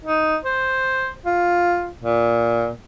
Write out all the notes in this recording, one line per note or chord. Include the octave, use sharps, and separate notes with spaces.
D#4
C5
F4
A#2